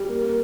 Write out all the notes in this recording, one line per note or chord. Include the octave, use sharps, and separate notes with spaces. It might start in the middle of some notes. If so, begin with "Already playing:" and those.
Already playing: G3
A#3
A#3